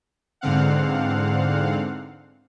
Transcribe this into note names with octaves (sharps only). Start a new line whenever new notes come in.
E2 G#2 D3 C4 F5 F#5